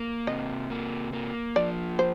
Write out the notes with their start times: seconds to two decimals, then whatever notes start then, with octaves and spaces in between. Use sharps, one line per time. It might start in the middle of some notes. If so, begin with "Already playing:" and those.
Already playing: A#3
0.27 C3 D#5
0.70 A#3
1.13 A#3
1.56 F3 D5
1.99 C5